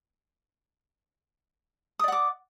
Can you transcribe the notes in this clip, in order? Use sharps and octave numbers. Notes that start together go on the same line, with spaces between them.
D5 F#5 D6 D#6